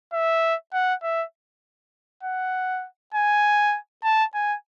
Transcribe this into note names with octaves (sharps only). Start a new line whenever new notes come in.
E5
F#5
E5
F#5
G#5
A5
G#5